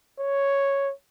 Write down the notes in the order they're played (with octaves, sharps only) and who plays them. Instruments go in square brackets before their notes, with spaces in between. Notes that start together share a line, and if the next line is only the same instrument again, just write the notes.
[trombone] C#5